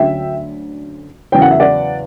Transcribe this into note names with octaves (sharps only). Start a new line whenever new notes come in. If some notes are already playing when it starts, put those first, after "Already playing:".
Already playing: D2 D3 F#3 C#4 E5 G5
E2 C#3 F#3 C#4 G5
F#5
E5
D5 F#5